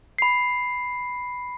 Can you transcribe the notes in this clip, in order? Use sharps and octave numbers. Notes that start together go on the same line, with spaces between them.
B5 C7